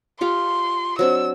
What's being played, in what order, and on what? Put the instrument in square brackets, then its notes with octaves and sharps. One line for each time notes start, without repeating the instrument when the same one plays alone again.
[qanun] F4 G4 F5 [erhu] C6
[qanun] F#3 C4 D4 [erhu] E6